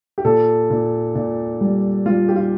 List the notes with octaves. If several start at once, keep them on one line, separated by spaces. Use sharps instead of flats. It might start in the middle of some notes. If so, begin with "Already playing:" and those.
G4
A#2 A4
A#2
A#2
G3
G3 F4
G4
F4